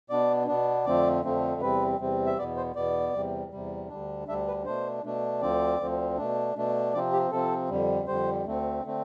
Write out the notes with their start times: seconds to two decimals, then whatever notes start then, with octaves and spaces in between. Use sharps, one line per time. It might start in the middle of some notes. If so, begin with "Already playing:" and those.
0.10 B2 B3 D4 D5
0.48 B2 B3 D4
0.86 F2 D3 F3 A3 C4 D5
1.24 F2 D3 F3 A3 C4
1.61 E2 C3 G3 C4 B4
1.99 E2 C3 G3 C4
2.26 E5
2.38 E2 B2 B3 D5
2.57 C5
2.76 E2 B2 B3 D5
3.14 E2 C3 G3
3.51 E2 C3 G3
3.89 D2 D3 G3 D4
4.28 D2 D3 G3 D4 E5
4.47 B4
4.65 B2 A3 D4 C5
5.04 B2 A3 D4
5.41 D2 D3 F3 C4 D5
5.80 D2 D3 F3 C4
6.18 B2 A3 D4
6.56 B2 A3 D4
6.94 C3 F3 C4 D5
7.13 G4
7.31 C3 F3 C4 A4
7.69 F2 D3 G3
8.07 F2 D3 G3 C5
8.46 D2 D3 A3 C4
8.85 D3 A3 C4